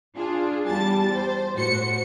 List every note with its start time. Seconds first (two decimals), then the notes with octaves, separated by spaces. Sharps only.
0.16 D4 F4 G#4
0.69 E2 G3 A5 A6
1.13 C5
1.54 A2 F#4 C5 C#7